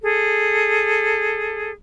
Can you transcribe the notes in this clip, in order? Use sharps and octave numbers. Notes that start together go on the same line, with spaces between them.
G#4 A4